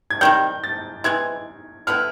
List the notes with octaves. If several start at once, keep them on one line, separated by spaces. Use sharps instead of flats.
G#6
C3 D#3 G3 G6
A6
C3 E3 G#3 G#6
D3 G3 B3 E4 F6